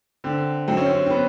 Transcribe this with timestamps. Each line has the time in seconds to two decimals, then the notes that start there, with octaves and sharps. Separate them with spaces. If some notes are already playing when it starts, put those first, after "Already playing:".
0.24 D3 C4
0.68 F#2 C4
0.77 C#4
0.86 C4
1.06 C4
1.10 B3